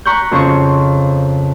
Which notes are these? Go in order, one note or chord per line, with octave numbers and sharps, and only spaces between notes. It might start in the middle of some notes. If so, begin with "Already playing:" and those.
A#5 B5 C#6 F#6 G6
F2 C#3 C5 C#6